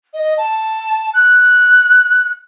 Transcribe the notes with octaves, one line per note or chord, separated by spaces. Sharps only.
D#5
A5
F#6